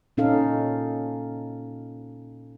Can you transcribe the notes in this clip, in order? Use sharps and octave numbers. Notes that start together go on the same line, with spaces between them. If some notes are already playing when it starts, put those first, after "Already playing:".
A#2 C#4 D#4 A4 F5